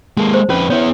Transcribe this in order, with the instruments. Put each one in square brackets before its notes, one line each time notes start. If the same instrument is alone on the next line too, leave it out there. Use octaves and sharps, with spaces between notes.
[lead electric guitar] G#3 A#3 [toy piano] A5
[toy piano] C5
[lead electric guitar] F2 B4 [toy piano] C#4
[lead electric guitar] B3 E4 [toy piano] C#5